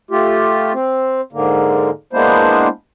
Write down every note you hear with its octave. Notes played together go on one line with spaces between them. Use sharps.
A3 F4 G4
C4
G#2 D3 A#3
G#3 A#3 B3 D4 E4 C5